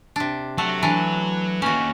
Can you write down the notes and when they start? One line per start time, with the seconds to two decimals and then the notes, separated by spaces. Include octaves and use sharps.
0.16 C3 D4
0.58 F#3 A3 F#5
0.83 E3 D4
1.62 D#2 C#4 F#4